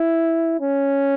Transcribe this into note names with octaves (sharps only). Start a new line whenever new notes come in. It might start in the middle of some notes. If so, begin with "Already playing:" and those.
Already playing: E4
C#4